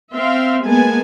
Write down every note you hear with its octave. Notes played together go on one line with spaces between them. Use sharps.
C4 E5 F5 C6
G#3 A#3 B3 G#5 A5